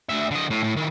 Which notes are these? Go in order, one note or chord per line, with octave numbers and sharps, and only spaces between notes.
D2 E5
D3 D#5
A2
A2
D#3 E4